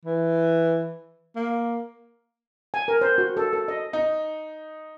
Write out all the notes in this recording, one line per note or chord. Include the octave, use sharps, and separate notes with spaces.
E3
A#3
G#5
A#4
C5
F#4
A4
A4
D#5
D#4